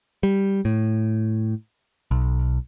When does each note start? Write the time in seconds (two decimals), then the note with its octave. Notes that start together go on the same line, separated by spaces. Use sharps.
0.23 G3
0.65 A2
2.11 B1